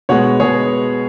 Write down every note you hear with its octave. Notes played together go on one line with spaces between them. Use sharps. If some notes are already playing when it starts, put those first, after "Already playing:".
B2 G#3 B3 C#5 F#5
B2 G#3 B3 G#4 C#5